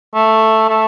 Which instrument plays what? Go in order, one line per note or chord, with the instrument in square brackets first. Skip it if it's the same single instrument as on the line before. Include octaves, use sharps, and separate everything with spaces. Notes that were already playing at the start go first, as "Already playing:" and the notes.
[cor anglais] A3
A3